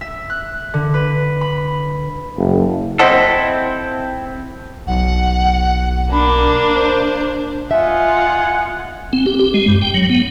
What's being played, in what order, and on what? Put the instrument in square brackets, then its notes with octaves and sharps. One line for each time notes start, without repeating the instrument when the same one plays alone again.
[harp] E5
F#6
D3
B4
B5
[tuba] F#1
[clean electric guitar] C4 E4 A4 [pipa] C5 D#5 F#5
[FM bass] B1 [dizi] F#5
[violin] A#3 D4 [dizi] B5
[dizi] C5
[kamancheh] F4 D#5 [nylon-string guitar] E5 [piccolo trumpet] F#5 [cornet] G#5
[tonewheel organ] C4
G4
G4
G#3
G2
G5
F#3
B3